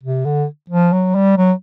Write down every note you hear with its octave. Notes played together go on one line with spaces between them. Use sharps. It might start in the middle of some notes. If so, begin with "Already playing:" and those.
C3
D3
F3
F#3
G3
F#3